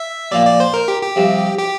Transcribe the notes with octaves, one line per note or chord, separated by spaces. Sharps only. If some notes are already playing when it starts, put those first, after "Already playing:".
Already playing: E5
A#2 F3 A#3 F4 D5
D5
C5
A#4
G4
G4
C2 C3 F3
G4